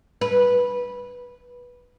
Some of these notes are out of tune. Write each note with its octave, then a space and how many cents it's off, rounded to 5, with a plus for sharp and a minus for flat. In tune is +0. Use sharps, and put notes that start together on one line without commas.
B4 -10